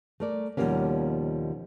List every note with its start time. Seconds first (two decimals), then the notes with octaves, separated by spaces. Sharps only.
0.20 A3 A#4 D5
0.57 D#2 B2 F3 G3 A#3 C#4